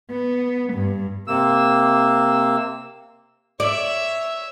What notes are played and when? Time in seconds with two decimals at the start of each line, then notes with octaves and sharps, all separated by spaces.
0.11 B3
0.73 G2
1.27 C3 A#3 E6
3.60 C#5 D5 E5